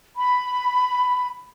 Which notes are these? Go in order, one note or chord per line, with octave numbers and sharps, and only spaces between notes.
B5